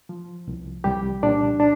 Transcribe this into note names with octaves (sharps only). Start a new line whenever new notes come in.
F3
C2
C2 G3 G4
A#2 D4 D5
D4